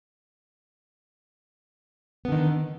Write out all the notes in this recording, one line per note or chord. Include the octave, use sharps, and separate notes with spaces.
D3 D#3 B3